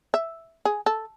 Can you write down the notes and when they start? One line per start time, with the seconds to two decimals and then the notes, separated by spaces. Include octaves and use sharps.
0.14 E5
0.65 G#4
0.86 A4